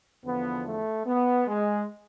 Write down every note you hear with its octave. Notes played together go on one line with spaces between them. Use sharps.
E2 D3 F3 B3
A3
B3
G#3